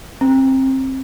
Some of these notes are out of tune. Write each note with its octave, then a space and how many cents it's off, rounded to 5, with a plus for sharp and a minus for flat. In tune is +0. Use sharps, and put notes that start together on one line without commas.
C4 +20